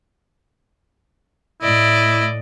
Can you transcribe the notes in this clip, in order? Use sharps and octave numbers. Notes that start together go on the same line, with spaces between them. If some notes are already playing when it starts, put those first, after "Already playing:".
A2 E4 D5 D#5